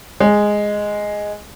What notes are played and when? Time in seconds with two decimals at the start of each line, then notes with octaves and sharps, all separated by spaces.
0.20 G#3